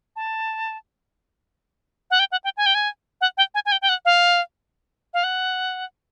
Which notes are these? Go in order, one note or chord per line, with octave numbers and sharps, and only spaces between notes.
A5
F#5
G5
F#5
G5
G#5
G5
G#5
F#5
G5
G#5
G#5
G5
G5
F#5
F5
F5
F#5